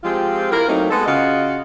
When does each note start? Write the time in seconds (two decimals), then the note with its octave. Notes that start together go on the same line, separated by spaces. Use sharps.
0.04 F3 G#3 C4 F4 G4
0.52 E4 F4 A#4
0.68 F#3 A3 A#3 C4 D#4
0.90 G#3 B3 A4
1.07 C#3 F4 F#4 D#5 F5